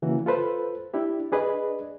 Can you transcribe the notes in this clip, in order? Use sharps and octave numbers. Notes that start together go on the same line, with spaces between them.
C#3 E3 A#3 F#4
F4 A4 B4 C5
D4 E4 G4
D4 G#4 B4 D5 D#5